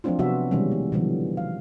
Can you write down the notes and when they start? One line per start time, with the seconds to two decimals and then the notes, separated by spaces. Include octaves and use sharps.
0.04 F3 F#3 A3 C4 D4 F4
0.19 C3 F#3 B3 F#4 E5
0.51 B2 D#3 E3 G3 G#3 C#4
0.71 A3
0.92 B2 D3 E3 F3 G3
1.37 F5